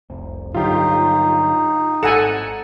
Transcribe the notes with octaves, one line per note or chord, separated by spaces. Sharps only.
F1 C2
G2 D3 F#3 D#4 F4 G4
G#1 A4 F#5 G#5 A#6 C#7 E7